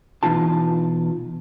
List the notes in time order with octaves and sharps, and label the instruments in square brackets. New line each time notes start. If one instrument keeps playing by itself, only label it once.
[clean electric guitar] B2 E3 D#4 F4 A5